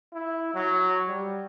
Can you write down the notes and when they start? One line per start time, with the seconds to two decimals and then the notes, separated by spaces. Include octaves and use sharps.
0.13 E4
0.54 F#3
1.08 G3